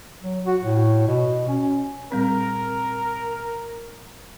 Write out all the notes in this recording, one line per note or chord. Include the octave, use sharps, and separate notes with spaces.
F#3
F#4
A2
B2
C#4
A#2 G3 C4 A#4